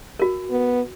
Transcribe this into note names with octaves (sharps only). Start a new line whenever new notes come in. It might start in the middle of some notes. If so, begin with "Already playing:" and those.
F#4 A#4
B3